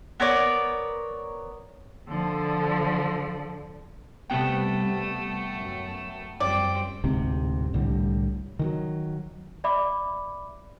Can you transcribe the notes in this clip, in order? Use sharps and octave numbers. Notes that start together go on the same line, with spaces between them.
B3 A#4 C#5 D5
D3 F3
C3 G3 A3 B3 G5
F#2 F#3
F#2 F3 G3 C4 D5 G5
D1 D2 G#2 C3
C2 A2 D3 G3
D#3 E3 F#3
D5 E5 B5 D6